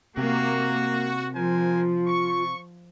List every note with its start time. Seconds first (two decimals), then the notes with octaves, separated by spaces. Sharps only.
0.17 C3 A#3 F#4
1.35 F3 F4 A#4 C5 G#5
2.07 C#6